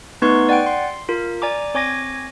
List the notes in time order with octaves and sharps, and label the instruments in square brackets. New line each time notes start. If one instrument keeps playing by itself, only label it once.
[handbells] A3 B3 D#4 B4 C6 C#6
D5 F#5 G5 D7
C6
F4 A#4
D5 G#5 A#5 D6
C4 C#5 G#5 D6 G#6 A#6